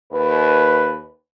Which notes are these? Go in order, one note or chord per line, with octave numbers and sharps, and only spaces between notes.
D#2 B4